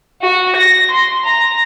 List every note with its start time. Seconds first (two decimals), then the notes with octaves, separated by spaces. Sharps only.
0.22 F#4
0.56 A#6
0.91 C6
1.25 A#5